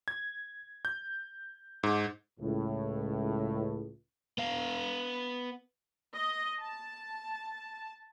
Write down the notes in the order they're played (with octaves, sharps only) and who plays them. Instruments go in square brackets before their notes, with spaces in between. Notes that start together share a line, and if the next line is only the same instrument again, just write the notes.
[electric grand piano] G#6
G6
G#2
[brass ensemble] C#2 A2
[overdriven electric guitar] B3 F5
[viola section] D#5
A5